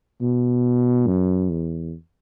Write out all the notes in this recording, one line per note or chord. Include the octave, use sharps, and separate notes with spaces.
B2
F#2
E2